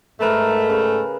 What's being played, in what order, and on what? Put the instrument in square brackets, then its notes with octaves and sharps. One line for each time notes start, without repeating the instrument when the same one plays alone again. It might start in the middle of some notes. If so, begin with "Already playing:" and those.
[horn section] G#2 A3 [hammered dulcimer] A#4 B4 A#5
[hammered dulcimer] C#3